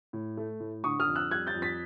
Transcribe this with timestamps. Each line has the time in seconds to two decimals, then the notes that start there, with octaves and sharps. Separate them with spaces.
0.13 A2
0.37 A3
0.60 A2
0.84 D3 C#6 D#6
1.00 D#6 F6
1.07 F2
1.16 E6 F#6
1.31 G3 F#6 G#6
1.47 G6 A6
1.55 F2
1.62 A6 B6